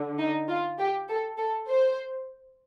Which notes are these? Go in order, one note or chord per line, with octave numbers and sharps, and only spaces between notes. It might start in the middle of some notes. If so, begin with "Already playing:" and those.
Already playing: D3
D#4
F4
G4
A4
A4
C5